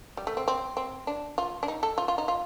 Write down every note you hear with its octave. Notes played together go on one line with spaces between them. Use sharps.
G3
A3
C4
C4
C4
D4
F4
D4
D#4
A4
F4
F4
D#4
F4